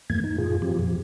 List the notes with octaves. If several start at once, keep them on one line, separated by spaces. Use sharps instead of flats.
E2 G2 E3 A3 A#3 G#6
D#4
F#2 A#2 F4 G#4
E3 F3 C4 F4 G4
F2 A#2 F3